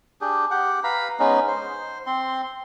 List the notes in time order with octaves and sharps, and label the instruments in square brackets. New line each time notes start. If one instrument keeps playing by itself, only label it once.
[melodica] D4 G4 G#4
G4 F#5
B4 F5 A#5 B5
G#3 B3 C#4 D#4
C5
C4 C6